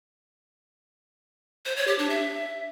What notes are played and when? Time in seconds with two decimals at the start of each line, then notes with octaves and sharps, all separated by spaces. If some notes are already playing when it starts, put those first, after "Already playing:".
1.65 C5
1.76 C#5
1.87 G4
1.99 D4
2.10 E5